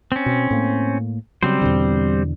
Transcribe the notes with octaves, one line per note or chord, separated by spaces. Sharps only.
C4 C#4
B2
A2 A#3
C#3 F#3 G3 C4 C5
E2 B2 D3